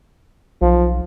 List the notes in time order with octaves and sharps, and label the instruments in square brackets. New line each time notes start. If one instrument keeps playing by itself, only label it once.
[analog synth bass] B1 [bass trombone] F3